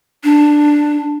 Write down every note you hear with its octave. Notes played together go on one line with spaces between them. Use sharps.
D4